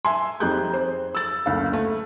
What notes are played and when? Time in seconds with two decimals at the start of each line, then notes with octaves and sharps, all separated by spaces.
0.05 E5 G#5 C6
0.40 F2 D#4 G4 G#4 F#6 G6
0.74 C5
1.15 E6 A6
1.46 F#1 D2 F5
1.73 A3